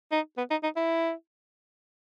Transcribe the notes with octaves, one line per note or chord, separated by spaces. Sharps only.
D#4
B3
D#4
D#4
E4